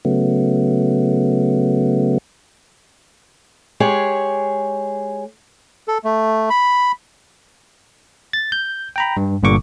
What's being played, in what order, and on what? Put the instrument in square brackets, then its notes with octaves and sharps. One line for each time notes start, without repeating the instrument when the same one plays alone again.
[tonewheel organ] C#3 F#3 A3 B3
[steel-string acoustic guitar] G#3 G4 G#4 C#5
[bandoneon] A4
A3
B5
[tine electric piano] A6
G6
G5 A#5 B5
G2
G1 G2 A#2 D3 C#6 D6